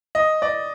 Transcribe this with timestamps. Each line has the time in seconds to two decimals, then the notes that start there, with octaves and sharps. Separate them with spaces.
0.15 D#5
0.42 D5